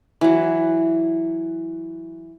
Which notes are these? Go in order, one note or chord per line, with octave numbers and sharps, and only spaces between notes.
E3 F#3